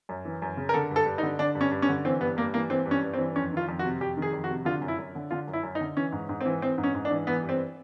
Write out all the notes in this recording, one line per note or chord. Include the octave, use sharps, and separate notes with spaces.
F#2
E3
F#2
C#3
A#4
D3 A4
G2 A4
G2
D#4
D3
D3 D4
G2
C#4
G2
C#4
D3
E3 C4
G2 B3
G2 A#3
E3 A#3
E3 C4
G2
C#4
G2
C4
E3
F2 C#4
D#3
F4
F2
F#4
C3
F2 G4
D#3
G#4
F2
F#4
C3
D3 F4
F#2
E4
F#2
D3
D3 F4
F#2
E4
F#2
D#4
D3
E3 C#4
G#2
G#2
C4
E3
E3 C4
G#2
C#4
G#2
D4
E3
E3 B3
G2
C4